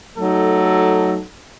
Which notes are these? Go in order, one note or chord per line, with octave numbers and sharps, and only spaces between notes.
F#3 A3 D#4 A4